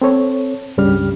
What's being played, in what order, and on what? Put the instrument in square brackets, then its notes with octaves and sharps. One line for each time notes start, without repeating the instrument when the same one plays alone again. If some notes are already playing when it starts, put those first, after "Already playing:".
[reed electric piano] C4 A4 C#5
C#2 G2 C#3 G3 G4 F6